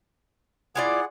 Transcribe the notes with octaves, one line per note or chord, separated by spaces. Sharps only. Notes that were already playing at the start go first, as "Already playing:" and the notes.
E4 F4 G#4 D5 F#5